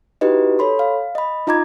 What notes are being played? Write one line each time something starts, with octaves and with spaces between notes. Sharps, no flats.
D#4 E4 F#4 G4 B4 D#5
A4 C#5 B5 C6
F5
D#5 B5
D#4 F4 D#5 A#5 D6 G#6